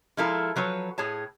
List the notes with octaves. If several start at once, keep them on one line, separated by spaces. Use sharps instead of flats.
F3 G#3 E4 F4 A4 A#4
F3 F#3 B4 C#5
A2 G#4 C#5 A5